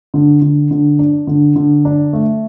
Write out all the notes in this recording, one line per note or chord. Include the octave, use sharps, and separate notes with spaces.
D3
D3
D3
D4
D3
D3
D4
A3